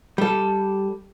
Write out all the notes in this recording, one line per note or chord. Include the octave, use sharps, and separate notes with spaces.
G3 A4